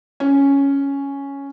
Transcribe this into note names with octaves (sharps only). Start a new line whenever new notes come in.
C#4